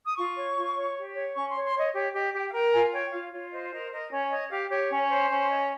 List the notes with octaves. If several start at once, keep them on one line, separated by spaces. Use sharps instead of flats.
D#6
F4 C#6
C#5
F4
C#5
G4
C#5
C#4 C#6
C#5 C6
C6
C#5 D#5
G4 C#5
G4 D#5
G4 G5
F5
A#4 G5
F4 G#5
C#5 G5
F4 F5
F4 C#5
C5 D#5
A#4 D#5
A#4 D#5
C#4 C#5
C#5 D#5
G4 F5
G4 C#5
C#4
C5
C#4
C#5 D#5